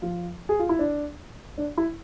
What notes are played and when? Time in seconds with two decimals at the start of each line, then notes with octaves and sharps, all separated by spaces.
0.02 F3 F4
0.49 G#4
0.59 F4
0.69 E4
0.79 D4
1.58 D4
1.78 E4